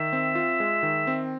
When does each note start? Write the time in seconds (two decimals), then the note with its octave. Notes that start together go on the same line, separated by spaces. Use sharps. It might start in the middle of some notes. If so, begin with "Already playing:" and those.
Already playing: D#3 E5
0.13 C4
0.35 F4
0.60 G#3
0.83 D#3
1.07 C4